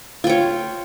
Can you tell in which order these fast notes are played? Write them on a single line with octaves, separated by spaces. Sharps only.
F4 G5 C#5